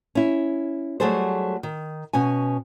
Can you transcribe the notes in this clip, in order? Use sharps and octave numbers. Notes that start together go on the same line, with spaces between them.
C#4 E4
F#3 G3 A3 G#4 A4 C5
D#3
B2 C#4 G#5